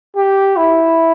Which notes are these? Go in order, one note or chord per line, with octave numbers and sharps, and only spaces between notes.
G4
E4